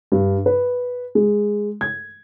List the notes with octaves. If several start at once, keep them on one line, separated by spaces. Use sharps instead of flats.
G2
B4
G#3
G#6